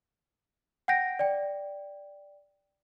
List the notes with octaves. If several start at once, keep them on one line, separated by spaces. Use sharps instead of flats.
F#5 G5 G6 A#6 D7
D5 G5